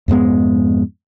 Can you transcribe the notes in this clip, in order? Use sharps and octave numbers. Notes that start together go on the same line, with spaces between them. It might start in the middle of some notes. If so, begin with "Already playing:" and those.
F2 G#2 G#3 B3